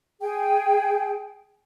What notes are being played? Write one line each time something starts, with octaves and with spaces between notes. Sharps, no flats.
G#4 G5